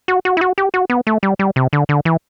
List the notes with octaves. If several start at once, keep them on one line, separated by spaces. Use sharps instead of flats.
F#4
F#4
E4
F#4
G4
F#4
B3
A3
G3
G3
C3
D3
D3
E3